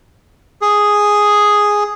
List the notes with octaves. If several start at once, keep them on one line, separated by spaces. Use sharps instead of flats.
G#4